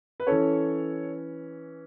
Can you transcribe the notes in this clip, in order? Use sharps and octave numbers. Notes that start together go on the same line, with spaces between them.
B4
E3 C#4 A4 C#5